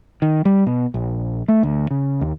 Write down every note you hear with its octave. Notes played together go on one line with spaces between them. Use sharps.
D#3
G3
B2
A#1
A3
D2
C#3
D#2